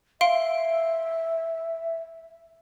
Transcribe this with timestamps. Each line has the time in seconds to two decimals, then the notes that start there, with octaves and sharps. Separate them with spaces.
0.21 E5 F5 C6 D7